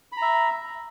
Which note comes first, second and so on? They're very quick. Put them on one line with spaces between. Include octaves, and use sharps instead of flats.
B5 A#5 E5